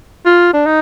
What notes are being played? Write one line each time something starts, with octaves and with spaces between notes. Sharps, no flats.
F4
D4
D#4